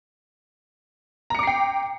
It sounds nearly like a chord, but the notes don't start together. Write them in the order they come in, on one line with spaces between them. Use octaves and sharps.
A#5 C#7 D6 C7 G5